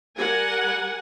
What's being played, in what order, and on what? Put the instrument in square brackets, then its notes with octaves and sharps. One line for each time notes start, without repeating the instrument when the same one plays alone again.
[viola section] G3 A#4 F#5 G#5